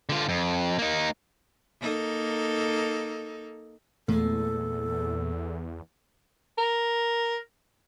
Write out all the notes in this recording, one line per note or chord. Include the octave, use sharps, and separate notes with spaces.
D3 F4
F2
A#3 D#4
A#3 D#4 A4
E2 A#2 G#3 A3 A4
A#4